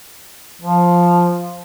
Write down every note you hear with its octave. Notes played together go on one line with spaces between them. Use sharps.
F3